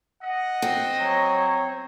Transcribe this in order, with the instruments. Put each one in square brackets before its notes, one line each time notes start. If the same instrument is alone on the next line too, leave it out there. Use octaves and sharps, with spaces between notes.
[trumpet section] D#5 [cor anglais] F#5
[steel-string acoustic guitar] C4
[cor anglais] F#3 [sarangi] C#5